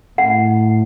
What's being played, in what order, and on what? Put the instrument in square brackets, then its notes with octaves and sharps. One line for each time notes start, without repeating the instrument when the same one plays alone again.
[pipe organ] A2 [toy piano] F#5